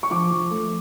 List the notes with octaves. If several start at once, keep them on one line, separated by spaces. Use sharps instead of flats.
C#6
F3 D6
F3
A3